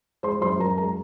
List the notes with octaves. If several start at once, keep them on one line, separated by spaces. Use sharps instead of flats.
G#3 C5 C6
F#2 C5 C6
F#2 A#4 A#5
G#3 A#4 A#5